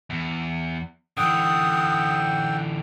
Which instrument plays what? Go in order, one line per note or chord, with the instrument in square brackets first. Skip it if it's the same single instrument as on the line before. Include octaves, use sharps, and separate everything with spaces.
[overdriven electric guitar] E2
[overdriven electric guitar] D3 E3 [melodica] F#5 G5 E6 [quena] D#6